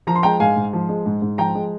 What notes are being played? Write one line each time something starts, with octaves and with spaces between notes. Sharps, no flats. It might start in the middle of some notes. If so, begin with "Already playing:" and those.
F3 A#5
C6
G#3 G5 A#5
G#2 F5 G#5
G#2
F3
G#3
G#2
G#2
F3 G5 A#5
G#3